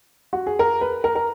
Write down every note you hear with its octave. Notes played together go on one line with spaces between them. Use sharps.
F#4
G#4
A#4
B4
A#4
A#4